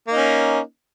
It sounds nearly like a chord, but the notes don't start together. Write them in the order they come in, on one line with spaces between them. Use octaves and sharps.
A#3 D#4 C#4